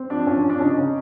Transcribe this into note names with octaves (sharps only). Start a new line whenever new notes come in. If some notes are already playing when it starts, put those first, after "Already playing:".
Already playing: C4
F3 D4
F3 C#4
D4
C4
D4
C#3 C#4 D#4
C#3